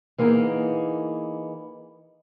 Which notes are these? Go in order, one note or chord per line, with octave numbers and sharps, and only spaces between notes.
E3 A#3 B3 D#4 G#4